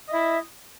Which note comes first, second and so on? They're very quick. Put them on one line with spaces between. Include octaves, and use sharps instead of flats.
D#5 E5 E4